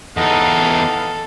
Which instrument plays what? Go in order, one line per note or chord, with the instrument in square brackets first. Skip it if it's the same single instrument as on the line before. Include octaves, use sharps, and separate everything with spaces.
[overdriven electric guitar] E2 D#4 [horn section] B3 D#5 F5 [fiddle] A4